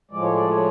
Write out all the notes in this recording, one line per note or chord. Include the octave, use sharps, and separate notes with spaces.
A2 F3 G#3 D5
C#5
D5
C#5